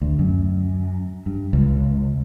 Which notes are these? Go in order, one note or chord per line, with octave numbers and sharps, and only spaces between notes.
D2
F#2
G2
C#2